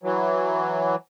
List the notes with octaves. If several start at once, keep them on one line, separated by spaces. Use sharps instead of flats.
E3 F#3